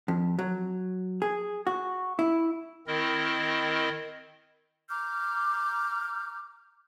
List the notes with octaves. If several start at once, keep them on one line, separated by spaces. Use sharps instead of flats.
F2
F#3
G#4
F#4
E4
D#3 C4 E4 A#4 D#5
A#5 D6 F6 G6